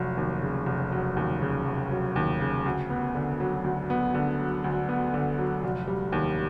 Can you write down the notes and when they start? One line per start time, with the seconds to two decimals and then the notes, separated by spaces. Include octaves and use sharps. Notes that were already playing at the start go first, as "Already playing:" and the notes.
Already playing: F1 F#3
0.17 D#2
0.43 C#3
0.66 F1
0.92 F#3
1.17 D#2
1.42 C#3
1.66 F1
1.90 F#3
2.16 D#2
2.41 C#3
2.66 D2
2.90 B3
3.15 D3
3.40 F#3
3.64 D2
3.90 B3
4.15 D3
4.39 F#3
4.64 D2
4.89 B3
5.14 D3
5.39 F#3
5.64 F1
5.88 G3
6.12 D#2